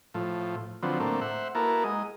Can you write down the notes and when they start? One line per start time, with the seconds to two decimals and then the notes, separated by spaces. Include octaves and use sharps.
0.14 A2 F3
0.83 D3 F3 F#3 B3 C4
1.00 A2 A3 A#3 C4 D4
1.21 C5 E5 F#5
1.55 A#3 B3 E4 F#4 A4 A#4
1.84 G#3 D#5